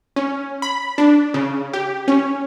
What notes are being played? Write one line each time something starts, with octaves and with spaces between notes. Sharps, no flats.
C#4
B5
D4
C#3
G4
C#4